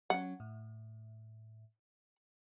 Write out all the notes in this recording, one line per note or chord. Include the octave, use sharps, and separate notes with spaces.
F#3 C#4 F#5
A2